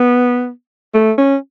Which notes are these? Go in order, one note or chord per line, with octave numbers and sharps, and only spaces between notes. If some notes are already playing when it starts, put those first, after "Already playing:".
Already playing: B3
A3
C#4